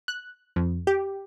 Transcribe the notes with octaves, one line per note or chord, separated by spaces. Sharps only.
F#6
F2
G4